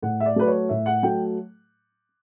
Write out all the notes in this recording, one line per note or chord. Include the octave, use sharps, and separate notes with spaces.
A2 F#5
E5
D5
F#3 A3 B4
C#5
A2 E5
F#5
F#3 A3 G5